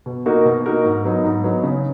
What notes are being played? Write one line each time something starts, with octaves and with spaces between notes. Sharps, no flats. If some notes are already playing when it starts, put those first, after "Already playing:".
B2
A#3 D#4 F#4 A#4
B2
A#3 D#4 F#4 A#4
G#2
F#3 B3 D#4
G#2
F#3 B3 D#4
C#3